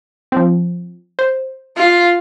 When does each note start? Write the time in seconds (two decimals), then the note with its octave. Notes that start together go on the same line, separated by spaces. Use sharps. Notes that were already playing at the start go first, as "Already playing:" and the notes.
0.32 F3 C4
1.19 C5
1.77 F4